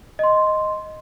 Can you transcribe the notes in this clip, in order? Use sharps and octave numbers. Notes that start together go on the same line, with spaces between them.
D#5 C6